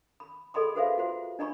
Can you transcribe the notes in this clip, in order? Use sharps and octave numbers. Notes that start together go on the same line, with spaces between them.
B5
G#4 A4 D#5 G5 B5 C6
F#4 G#4 B4 C5 E5 F5
F4 F#4 C5
D4 D#5 A#5 B5 C#6